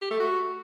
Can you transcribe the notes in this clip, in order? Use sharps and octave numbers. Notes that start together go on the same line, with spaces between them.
G4
A3
F#4